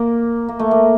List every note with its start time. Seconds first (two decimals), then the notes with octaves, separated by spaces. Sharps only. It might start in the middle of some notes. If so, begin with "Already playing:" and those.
Already playing: A#3
0.49 A#3
0.59 A3
0.71 A#3